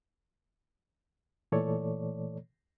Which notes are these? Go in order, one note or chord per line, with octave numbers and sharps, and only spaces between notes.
A#2 E3 A3 A4 C#5 D5